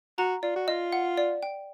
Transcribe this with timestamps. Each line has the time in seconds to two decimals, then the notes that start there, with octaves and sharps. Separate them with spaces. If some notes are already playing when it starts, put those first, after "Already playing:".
0.18 F#4 A#5
0.43 F4 D5
0.56 F#4
0.68 F4 D#5
0.93 F#5
1.17 D5
1.43 G5